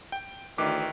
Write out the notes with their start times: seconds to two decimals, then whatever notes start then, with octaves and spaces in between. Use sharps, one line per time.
0.12 G5
0.58 D2 D#3 E3 D6